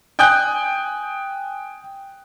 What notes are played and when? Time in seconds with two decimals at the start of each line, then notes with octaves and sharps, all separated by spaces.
0.19 G5 G#5 D#6 F#6 G6